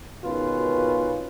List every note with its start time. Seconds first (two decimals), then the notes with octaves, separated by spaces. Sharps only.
0.24 G#1 B2 D#3 C#4 F4 B4